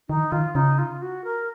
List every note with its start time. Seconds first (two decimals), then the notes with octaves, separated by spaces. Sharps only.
0.09 D#3 D#4
0.32 D#3 F4
0.55 C#3 D#4
0.78 F4
1.02 F#4
1.24 A#4